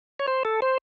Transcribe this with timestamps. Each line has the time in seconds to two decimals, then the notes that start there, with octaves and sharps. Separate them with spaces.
0.19 C#5
0.28 C5
0.45 A4
0.62 C5